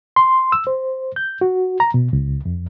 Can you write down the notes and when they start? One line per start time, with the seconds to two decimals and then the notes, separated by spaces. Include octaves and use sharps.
0.16 C6
0.52 E6
0.67 C5
1.16 G6
1.41 F#4
1.80 A#5
1.94 B2
2.13 C#2
2.45 F2